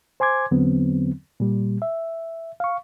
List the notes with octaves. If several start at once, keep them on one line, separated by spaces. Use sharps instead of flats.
C5 G#5 C6 D6 G#6
E2 D3 F#3 B3 C4
A#2 G3
E5
F5 C#6